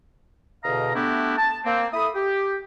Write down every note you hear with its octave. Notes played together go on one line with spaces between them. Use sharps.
E2 B2 D3 D#5 F5 A#5
A3 B3 D4 E4 F#4 G4
A5
A#3 C4
E4 A4 B5 D#6
G4